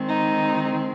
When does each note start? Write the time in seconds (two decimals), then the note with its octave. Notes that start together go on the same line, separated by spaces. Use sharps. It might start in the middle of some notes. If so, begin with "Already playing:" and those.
Already playing: D#3 G#3 C4
0.09 D#4